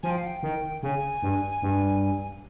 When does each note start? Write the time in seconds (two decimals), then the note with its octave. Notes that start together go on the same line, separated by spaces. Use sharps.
0.03 F3 G#5
0.11 G5
0.18 F5
0.27 G5
0.43 D#3
0.83 C#3 G#5
1.23 G2
1.62 G2